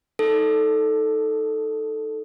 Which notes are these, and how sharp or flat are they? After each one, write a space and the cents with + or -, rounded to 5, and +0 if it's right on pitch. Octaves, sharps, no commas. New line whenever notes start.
D#4 +10 A4 +0